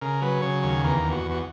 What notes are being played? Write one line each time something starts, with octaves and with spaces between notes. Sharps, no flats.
C#3 A#4
F#3 B4
C#3 C#5
D#2 C#5
E2 A#4
E2
F#4
E2
F#4